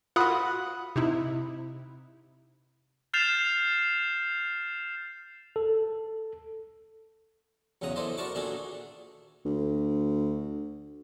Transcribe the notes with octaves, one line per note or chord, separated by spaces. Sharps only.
F4 F#4 F#5 B5 D#6
C3 D#4 E4
F6 G6 A6 C7 E7 F7
A4
B1 E2 C#3 F#5 A#5 D#6
B3 E4 A4 C5 D5 D#5
F#4 A#4 D5 A5 C#6 D6
A#2 D#3 D4 F#4 G#4 A4
D2